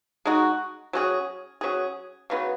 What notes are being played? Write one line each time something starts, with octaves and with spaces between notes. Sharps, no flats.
G#3 D#4 F#4
F#3 C#4 G#4
F#3 C#4 G#4
C#3 F#3 B3